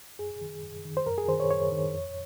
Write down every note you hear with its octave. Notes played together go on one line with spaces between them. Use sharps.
F#2 G#4
D#3
F#2
D#3
C5
F#2 A#4
G#4
D#3 C5
C#5
F#2 C#5
D#3
F2